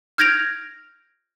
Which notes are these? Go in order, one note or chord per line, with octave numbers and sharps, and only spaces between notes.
F6 G6 G#6 A#6 D7 F7